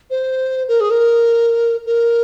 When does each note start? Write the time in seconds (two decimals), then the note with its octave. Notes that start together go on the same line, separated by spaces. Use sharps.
0.10 C5
0.68 A#4
0.80 G#4
0.90 A#4
1.86 A#4